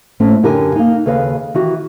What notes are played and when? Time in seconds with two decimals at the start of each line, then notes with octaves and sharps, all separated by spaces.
0.20 A2 A3 C4 C#4
0.43 F#2 D3 G4 A#4 G5 G#5
0.76 A#3 D#4
1.06 D#2 C#3 A4 B4 D#5 F5
1.54 D#3 E3 F#4 G4